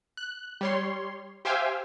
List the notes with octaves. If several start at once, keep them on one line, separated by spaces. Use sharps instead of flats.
F#6
G3 C#5 C6
G4 C5 E5 F5 G5 G#5